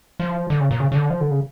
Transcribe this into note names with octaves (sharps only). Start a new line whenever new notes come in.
F3
D3
C#3
A#2
C#3
C#3
D3
F3
D3
C#3